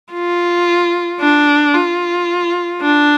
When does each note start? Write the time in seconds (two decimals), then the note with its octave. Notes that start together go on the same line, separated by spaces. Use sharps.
0.13 F4
1.20 D4
1.74 F4
2.81 D4